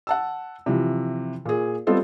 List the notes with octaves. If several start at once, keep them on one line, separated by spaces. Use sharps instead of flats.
F#5 A5 E6
C3 E3 F3
A#2 G#4
G3 B3 C4 F4 A4 D#5